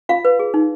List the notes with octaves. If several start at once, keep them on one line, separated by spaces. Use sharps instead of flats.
F4 F5
B4
G#4
D#4